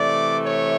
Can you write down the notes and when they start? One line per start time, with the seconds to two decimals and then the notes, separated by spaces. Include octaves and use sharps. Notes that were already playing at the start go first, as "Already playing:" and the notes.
Already playing: C3 E3 A3 D5
0.43 C#5